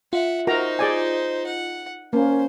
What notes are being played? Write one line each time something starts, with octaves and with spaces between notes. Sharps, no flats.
F4 E5 F#5
D#4 F#4 A#4 C5 A#5
G#4 D5 G#5
F#5
A#3 C#4 C5